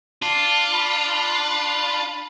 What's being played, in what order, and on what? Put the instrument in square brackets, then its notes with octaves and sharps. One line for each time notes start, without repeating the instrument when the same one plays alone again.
[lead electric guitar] D4 [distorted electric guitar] F4
[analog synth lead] B5